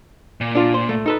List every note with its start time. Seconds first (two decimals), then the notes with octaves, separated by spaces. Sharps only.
0.41 A#2
0.55 D4 F4
0.74 C5
0.89 A3
1.06 D#4 A4 B4